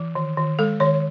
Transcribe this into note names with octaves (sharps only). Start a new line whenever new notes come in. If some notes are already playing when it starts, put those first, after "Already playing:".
Already playing: E3
D#3
D#3
G#3 A4
D#3 C#5